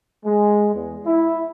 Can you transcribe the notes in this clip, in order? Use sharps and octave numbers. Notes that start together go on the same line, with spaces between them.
G#3
E2
E4